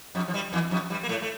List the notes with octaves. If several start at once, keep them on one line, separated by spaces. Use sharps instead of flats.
F2 F3
F3
G2 G3
E2 E3
F2 F3
G2 G3
A#3
A2 A3
A3